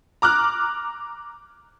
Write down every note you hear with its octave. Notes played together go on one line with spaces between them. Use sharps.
A#5 D6 F6 F#6